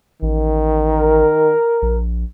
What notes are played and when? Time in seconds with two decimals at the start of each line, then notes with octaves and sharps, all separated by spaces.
0.22 A1 D#3
0.91 A#4
1.82 A#1